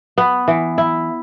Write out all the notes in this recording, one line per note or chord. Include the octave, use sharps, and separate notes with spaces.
B3
E3
E4